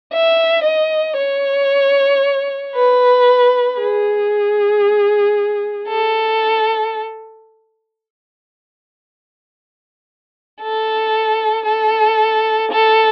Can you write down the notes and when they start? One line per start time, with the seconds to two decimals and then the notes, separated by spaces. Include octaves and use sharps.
0.13 E5
0.64 D#5
1.17 C#5
2.75 B4
3.79 G#4
5.89 A4
10.61 A4
11.66 A4
12.71 A4